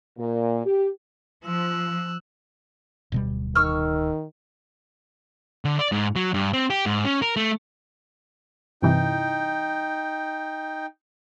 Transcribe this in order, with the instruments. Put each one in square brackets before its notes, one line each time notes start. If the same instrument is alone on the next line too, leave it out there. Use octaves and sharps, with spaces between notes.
[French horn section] A#2
G4
[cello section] F3 [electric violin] E6 F#6
[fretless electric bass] D1 B2 G3
[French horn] D#3 [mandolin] C#6 E6 F6
[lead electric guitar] D3
D5
G#2
F#3
G2
C4
G4
G#2
C#4
A#4
A3
[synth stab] G2 C3 E3 [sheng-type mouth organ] D#4 G5